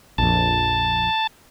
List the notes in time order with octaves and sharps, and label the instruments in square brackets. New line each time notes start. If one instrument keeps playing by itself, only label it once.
[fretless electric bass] A#1 F2 [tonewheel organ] A5